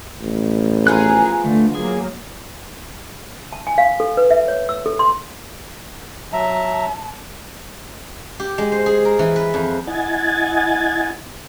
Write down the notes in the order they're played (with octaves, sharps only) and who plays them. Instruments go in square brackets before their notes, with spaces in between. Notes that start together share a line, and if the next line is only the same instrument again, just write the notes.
[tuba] A1
[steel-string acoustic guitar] F3 B3 F4 [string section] G#4 [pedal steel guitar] A#5 F6 F#6
[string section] D3 [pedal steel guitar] A3
[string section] F#3 A#3 [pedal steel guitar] G#4
[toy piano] A5
G#5
F5
A4
B4
E5
C#5
E6
A4
C6
[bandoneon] F#3 E5 A#5 [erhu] A5
[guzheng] G4
G#3
C5
G#4
A#4
E3
B4
F2
[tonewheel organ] E4 D#5 F#5 G#5 G#6 A6